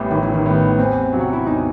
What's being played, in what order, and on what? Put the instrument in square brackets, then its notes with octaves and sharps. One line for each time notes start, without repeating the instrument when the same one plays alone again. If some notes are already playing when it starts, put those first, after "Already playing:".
Already playing: [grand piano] A1 A2 G3 B3
[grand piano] A1 [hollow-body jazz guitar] D#3
[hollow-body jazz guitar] E3
D#3
[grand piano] A2 G3 B3
[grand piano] E2 [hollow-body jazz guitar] C4
[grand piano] C3 F#3
[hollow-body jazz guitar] F#4
E4
[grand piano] E2 [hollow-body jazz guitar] D#4